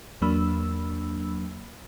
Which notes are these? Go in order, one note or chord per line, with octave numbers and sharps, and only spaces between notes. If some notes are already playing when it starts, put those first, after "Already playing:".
E2 F#3 A#3 D4 B5 E6